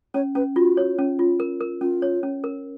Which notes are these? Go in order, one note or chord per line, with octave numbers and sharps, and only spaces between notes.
C#4 C#5
C#4 B4
F4 F#4
C#5
C#4
F4
A#4
A#4
C#4 F4
C#5
C#4
A#4